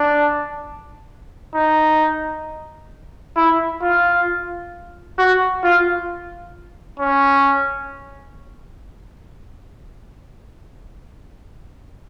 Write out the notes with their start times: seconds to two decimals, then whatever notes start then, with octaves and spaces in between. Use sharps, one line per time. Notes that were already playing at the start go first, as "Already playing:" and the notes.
Already playing: D4
1.55 D#4
3.36 E4
3.82 F4
5.18 F#4
5.64 F4
7.00 C#4